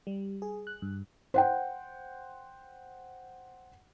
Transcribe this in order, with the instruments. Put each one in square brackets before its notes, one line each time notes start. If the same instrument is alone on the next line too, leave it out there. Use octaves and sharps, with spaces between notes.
[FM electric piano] G3
G#4
F#6
G2
[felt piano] C5 F#5 G5